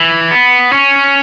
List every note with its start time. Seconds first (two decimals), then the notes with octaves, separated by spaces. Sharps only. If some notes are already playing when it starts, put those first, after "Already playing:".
Already playing: E3
0.31 B3
0.72 C#4